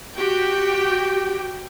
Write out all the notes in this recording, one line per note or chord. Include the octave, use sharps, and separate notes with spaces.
F#4 G4 G5